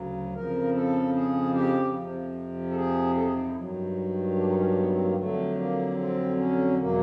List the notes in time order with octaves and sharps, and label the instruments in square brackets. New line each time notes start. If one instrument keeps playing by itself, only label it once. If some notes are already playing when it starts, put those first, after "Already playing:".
Already playing: [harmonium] D2 C#3 F#3
F2 C#3 F3 A#4
A4
G#4
G4
F2 C3 F3
A4
G#4
A4
G#4
D#4
E4
G2 D#3 F#3
D4
D#4
C#4
D4
B3
C4
A#3
F2 D3 F#3 A3
A#3
C4
C#4
E2 B2 F#3 A#3